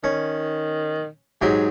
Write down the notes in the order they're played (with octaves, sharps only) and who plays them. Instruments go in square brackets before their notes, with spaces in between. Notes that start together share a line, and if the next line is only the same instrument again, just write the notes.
[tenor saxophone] D#3 [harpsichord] C#4
[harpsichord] G#2 F#3 G4 [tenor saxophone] G#4